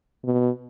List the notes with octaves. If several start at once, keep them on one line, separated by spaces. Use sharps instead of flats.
B2